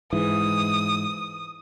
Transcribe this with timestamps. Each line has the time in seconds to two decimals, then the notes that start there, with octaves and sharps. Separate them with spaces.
0.13 G#2 E3 D#6